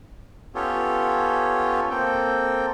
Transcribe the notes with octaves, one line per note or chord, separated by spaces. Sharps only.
B3 C#4 F4 G4 A4 C#5
A#3 C4 A4 G5